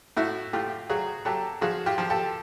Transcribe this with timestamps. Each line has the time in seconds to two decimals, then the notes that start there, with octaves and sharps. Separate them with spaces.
0.17 A2 E4 F#4
0.53 A2 F4 G4
0.89 F#3 F#4 G#4
1.25 F#3 G4 A4
1.61 F3 F#4 G#4
1.86 F4 G4
1.98 F3
2.10 G4 A4